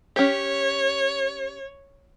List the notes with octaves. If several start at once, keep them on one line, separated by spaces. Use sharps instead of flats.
C#4 G4 C#5